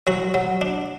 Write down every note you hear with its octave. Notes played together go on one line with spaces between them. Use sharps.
F#3 F#4
F#3
D4